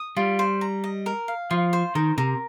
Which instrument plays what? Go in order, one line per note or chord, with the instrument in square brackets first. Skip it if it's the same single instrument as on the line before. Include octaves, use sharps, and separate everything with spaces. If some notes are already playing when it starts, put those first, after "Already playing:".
Already playing: [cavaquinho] D#6
[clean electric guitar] G3 [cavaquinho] F4
[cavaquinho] C5
A#5
D#5
A#4
F5
[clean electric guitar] F3 [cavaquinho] F4
[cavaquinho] C5
[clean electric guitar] D#3 [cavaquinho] A#4
[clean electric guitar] C3 [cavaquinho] A#4